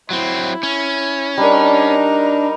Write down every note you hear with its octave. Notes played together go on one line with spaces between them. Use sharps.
F#3 C4 E4
C#4
G3 D4 D#4 A#4